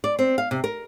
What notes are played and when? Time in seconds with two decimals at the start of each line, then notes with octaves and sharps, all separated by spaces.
0.04 D5
0.19 C4
0.38 F5
0.51 C3
0.64 A#4